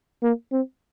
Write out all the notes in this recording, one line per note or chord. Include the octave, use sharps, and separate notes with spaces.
A#3
C4